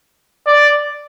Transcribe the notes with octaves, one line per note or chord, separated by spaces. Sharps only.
D5